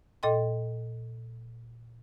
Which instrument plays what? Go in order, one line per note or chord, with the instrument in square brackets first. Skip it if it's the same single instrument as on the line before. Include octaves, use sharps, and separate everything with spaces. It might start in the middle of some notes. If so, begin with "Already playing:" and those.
[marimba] A#2 A4 D#5 G5 C6